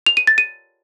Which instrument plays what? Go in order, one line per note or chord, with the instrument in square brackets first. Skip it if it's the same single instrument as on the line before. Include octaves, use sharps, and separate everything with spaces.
[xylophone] F7
D#7
A6
D#7